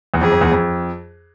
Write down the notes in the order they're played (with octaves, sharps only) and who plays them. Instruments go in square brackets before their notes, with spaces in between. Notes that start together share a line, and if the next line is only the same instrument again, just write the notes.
[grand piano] E2
[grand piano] F2 [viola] G#4
[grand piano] F2
E2
F2